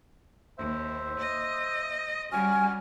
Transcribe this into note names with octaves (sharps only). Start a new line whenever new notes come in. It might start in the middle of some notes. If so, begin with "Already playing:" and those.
D#2 C5 E5
D#5
G3 C#4 F#4 G#5 F6